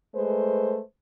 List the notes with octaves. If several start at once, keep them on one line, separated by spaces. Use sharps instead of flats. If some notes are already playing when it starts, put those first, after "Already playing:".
G#3 A3 B4 C5